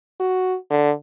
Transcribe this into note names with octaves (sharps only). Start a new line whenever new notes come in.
F#4
D3